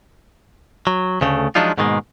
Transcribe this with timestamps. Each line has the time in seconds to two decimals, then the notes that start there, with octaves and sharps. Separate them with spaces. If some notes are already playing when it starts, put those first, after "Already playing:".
0.87 F#3
1.21 D2 C#3 A3
1.55 F3 F#3 G#3 D4 D#4 F4
1.77 G#2 B2 D#3 G3 G#3 A#3